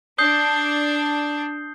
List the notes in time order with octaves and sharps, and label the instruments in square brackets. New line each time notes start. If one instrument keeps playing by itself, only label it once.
[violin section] D4 [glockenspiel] D#6 G6 C7 G7